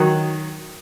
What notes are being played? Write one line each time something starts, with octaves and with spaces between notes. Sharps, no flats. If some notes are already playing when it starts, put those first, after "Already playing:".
Already playing: D#3 F#3